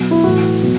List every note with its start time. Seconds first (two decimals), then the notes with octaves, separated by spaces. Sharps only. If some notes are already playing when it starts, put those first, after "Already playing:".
Already playing: B2 F#3
0.11 E4
0.24 A2 E3 F#4
0.62 B2 F#3